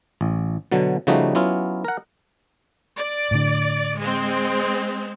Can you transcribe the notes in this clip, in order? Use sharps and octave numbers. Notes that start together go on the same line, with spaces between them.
A1
B2 D3 F#3
C#3 F3 G3 A3 D#4 F#4
F#3 B3 C#4 E4 F4
A#4 F#5
D5
A2 D3
G#3 C4